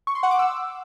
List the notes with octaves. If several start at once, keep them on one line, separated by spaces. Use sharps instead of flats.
C#6
C6
F#5
D6
E6